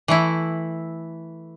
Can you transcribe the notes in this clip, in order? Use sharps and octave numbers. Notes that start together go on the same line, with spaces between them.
E3 A3 E4